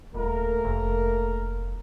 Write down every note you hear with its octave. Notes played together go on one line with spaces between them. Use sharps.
D#1 A3 A#3 A#4
F1